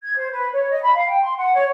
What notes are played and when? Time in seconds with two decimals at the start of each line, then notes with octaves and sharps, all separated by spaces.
0.03 G#6
0.16 C5
0.32 B4
0.52 C#5
0.70 D#5
0.82 B5
0.95 F5
1.07 G5
1.22 C6
1.37 F#5
1.54 C#5